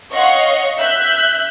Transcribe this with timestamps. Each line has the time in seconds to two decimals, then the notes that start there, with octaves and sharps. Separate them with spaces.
0.11 C#5 D#5 F5 F#5 C#6
0.78 E5 F#6 G6 B6